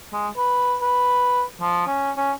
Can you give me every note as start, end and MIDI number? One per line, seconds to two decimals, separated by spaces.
0.13 0.28 56
0.37 0.76 71
0.82 1.43 71
1.61 1.84 53
1.87 2.11 61
2.17 2.32 61